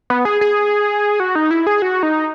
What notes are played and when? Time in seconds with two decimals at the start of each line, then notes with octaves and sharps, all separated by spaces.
0.10 B3
0.25 G#4
0.41 G#4
1.20 F#4
1.35 D#4
1.51 E4
1.67 G#4
1.82 F#4
2.03 D#4